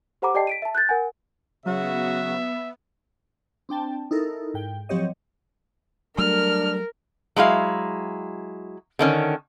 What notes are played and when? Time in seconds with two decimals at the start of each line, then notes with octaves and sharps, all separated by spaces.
0.22 G4 C5 F#5 A#5 B5 D6
0.34 G4 D5 D#5 G5 A5 C7
0.47 B6 D7 D#7
0.62 E5 A5
0.75 F#6 G6 A6
0.89 A#4 F#5 G#5
1.66 C#3 F#3 B3 F#4 E5
3.69 C4 D4 G5 A5
4.11 D#4 E4 A4 A#4
4.54 G#2 G5
4.89 F3 F#3 C4 G4 C#5 D#5
6.18 F#3 G3 A3 D4 A#4 F6
7.36 F#3 G#3 E4 F5
8.99 D3 D#3 C#4